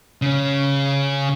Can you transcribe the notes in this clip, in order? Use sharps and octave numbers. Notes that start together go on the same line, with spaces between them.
C#3 C#4